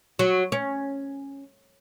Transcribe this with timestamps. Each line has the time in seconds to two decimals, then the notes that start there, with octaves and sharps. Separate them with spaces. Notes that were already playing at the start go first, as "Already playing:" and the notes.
0.19 F#3
0.52 C#4